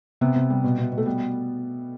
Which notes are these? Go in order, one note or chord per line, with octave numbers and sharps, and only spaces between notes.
C3 B3
C3
G3
B2
B2
B2
A3
G3 B3